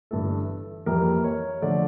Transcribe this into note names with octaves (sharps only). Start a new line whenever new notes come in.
G1 G2 E3 A3 A4
F2 E3 G3 A#3 A#4
C#5
D3 F3 A3 D5